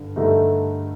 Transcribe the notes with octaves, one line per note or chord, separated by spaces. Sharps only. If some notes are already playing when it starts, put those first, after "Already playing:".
Already playing: G2 D3
G2 D3 A3 D#4